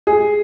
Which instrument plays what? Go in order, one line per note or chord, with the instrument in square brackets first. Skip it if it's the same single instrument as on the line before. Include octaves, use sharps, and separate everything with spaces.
[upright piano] G#4